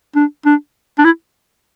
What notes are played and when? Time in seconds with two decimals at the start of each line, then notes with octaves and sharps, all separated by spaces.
0.16 D4
0.46 D4
0.98 D4
1.05 E4